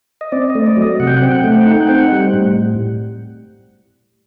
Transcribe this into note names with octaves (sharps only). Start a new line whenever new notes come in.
D#5
C4 D5
D#5
A3
D5
F#3
D#5
C3 F#5
G5
F#5
C4 G5
F#5
G5
A3 F#5
G5
D#4 F#5
G5
F#5
C4 G5
F#5
G3
A2